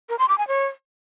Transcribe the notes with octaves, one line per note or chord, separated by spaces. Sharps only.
A#4
C6
D6
G#5
C#5